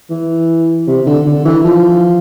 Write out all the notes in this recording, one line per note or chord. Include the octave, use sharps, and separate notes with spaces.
E3
C3
D3
D3
E3
F3